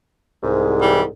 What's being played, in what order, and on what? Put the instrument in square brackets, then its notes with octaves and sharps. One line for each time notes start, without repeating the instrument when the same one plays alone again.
[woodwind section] C2 G#2
[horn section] E3 G3